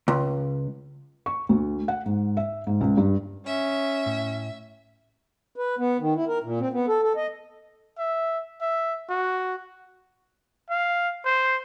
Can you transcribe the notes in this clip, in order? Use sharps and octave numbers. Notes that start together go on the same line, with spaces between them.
C#2
C#6
D2
F#5
G#2
E5
G#2
C#2
G2
C#4 E5
A2
B4
B3
D#3
E4
A#4
A#2
C4
B3
A4
A4
D#5
E5
E5
F#4
F5
C5